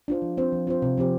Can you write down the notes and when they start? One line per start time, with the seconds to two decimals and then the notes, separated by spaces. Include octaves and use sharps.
0.08 D4 F4 C5
0.22 F3
0.37 C4 F4 C5
0.52 F3
0.67 C4 F4 C5
0.82 C3
0.97 F3 C4 G4 C5